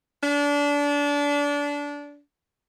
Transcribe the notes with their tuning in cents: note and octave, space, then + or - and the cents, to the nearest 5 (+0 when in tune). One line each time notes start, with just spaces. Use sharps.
D4 -25